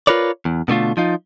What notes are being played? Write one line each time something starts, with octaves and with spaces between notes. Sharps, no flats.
F4 A#4 B4 C#5 D5
E2
B2 D3 A3 F4
F3 D#4 F4